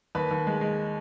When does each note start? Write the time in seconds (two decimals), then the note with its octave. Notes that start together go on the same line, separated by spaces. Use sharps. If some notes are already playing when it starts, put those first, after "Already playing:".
0.15 D#2 B4
0.31 D#2
0.47 G#3
0.61 G#3